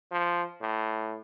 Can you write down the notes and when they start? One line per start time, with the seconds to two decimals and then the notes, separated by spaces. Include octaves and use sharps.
0.11 F3
0.61 A2